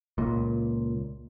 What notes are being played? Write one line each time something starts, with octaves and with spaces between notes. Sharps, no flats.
C#2 A#2